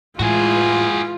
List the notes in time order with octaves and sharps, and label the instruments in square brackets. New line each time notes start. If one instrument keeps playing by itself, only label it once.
[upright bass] A2 [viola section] E3 G#3 [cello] F4 [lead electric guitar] F#4 G#4